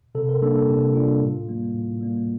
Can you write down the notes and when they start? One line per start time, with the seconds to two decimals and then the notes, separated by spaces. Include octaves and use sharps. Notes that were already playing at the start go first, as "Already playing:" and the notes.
0.15 C3 A4
0.29 A#4
0.42 G3 A#3 D4 A4
0.56 A4
0.69 C3 G4
0.94 G3 A#3 D4 F4
1.22 A2
1.49 G3 A#3
1.74 A2
2.01 G3 A#3